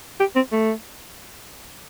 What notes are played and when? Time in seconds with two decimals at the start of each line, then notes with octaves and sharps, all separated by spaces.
0.20 G4
0.36 C4
0.52 A3